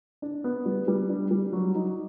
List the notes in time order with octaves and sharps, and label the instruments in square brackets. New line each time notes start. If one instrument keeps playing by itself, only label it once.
[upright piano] D4
B3
G3
G3
D4
G3
F#3
D#4